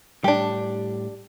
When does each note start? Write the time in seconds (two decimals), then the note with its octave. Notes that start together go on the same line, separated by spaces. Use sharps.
0.24 A2 G3 D4 G4